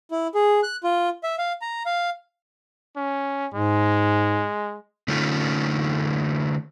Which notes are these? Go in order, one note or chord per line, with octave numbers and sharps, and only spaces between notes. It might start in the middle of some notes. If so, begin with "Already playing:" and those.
E4
G#4
F#6
F4
E5
F5
A#5
F5
C#4
G#2 G#3
D3 A3 C#4 D#4 F4